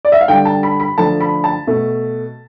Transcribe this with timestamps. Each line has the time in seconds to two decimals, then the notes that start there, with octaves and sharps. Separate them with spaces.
0.05 D5
0.12 E5
0.21 F5
0.28 D3 G3 G5
0.45 A5
0.63 B5
0.80 B5
0.98 D3 F3 A3 A5
1.21 B5
1.44 A5
1.67 B2 A3